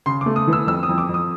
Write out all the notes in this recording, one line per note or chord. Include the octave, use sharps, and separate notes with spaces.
C#3 C6
D6
A3
D#6
E3
E6
F2 E6
D#6
F2
D6
F2
D#6